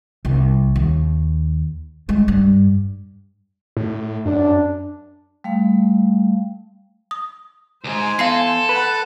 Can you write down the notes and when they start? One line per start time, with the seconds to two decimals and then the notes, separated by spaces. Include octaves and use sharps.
0.25 C2
0.76 D#2
2.09 G#3
2.28 G2
3.77 A2
4.26 F#2 D4
5.44 G3 A3 F5
7.11 D#6
7.84 C#2 G#2 C5 G#5
8.19 E2 A4 F5 C6 C7
8.69 B4 F#5 A5